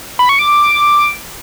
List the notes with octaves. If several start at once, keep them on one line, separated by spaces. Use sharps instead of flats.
B5
C#6
D6